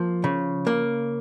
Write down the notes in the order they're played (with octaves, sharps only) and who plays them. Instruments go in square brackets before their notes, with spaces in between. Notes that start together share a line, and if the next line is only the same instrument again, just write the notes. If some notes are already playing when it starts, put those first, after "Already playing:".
Already playing: [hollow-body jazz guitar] F3 A#3
C#3
A#3